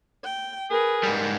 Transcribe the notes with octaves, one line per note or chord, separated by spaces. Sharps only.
G5
G#4 A#4 B4
G#2 G3